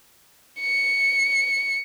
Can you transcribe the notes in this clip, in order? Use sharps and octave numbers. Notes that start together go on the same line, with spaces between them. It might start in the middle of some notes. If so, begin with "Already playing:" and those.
C#7